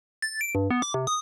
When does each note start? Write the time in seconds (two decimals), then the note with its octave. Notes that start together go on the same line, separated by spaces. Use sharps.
0.22 A6
0.41 D7
0.55 G2
0.70 B3
0.82 D6
0.94 C3
1.07 D#6